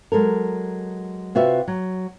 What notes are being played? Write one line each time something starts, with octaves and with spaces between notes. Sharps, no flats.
F#3 G#3 A4 A#4
C3 F4 F#4 B4 E5
F#3